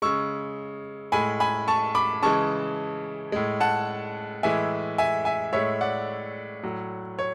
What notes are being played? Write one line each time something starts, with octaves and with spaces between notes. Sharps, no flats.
C#3 G#3 C#6 E6
A2 G#3 G#5 B5
G#5 B5
A5 C#6
B5 D6
C#3 E3 G#3 A5 C#6
A2 G#3
F#5 A5
A2 E3 G#3 E5 G#5
E5 G#5
E5 G#5
A2 G#3 C#5 E5
D5 F#5
A2 F#3
C#5